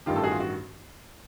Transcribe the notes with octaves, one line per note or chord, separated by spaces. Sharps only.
A1 G2 D#3 F4 G4
A4
F#4 G#4
F4
F#4